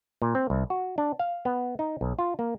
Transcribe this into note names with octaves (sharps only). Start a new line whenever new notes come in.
A#2
C4
C2
F#4
D4
F5
B3
D#4
B1
F4
A#3